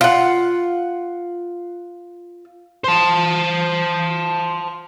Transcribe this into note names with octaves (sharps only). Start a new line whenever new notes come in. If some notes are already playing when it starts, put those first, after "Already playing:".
F4 F#5
C5 A5